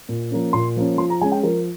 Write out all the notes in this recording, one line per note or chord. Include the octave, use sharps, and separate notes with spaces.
A#2
F3 A#3 C#4
A#2 C6
F3 A#3 C#4
F3 C6
A#5
G#3 C#4 G#5
G5
F3 A#4